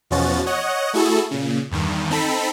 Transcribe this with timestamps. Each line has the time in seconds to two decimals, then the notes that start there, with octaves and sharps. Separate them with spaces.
0.11 E2 B2 F3 C#4 F#4 A6
0.46 C#5 D#5 F#5
0.93 A3 E4 F#4 G#4 A4
1.31 A#2 C#3
1.71 E2 G2 D#3
2.10 C4 D#4 A4 B5 B6